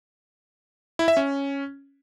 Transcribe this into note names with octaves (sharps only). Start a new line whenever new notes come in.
E4
E5
C#4